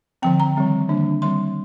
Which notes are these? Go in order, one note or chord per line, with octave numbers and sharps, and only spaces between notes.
D3 F3 C4 G5
A#5
D#3 G3 C4
D3 G3 A#3 D4
D#3 G3 C4 C6